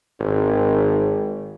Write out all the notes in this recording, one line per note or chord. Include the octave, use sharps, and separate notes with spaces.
G#1